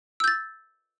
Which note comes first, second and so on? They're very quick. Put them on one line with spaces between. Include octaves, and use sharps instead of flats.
E6 G6 A6